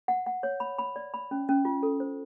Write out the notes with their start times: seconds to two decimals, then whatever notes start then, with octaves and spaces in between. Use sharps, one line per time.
0.08 F#5
0.26 F#5
0.43 C#5
0.60 B5
0.79 B5
0.96 D5
1.14 B5
1.31 C#4
1.49 C#4
1.65 F4
1.83 A4
2.00 C5